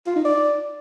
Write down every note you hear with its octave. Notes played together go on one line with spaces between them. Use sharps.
F4
D#4
D5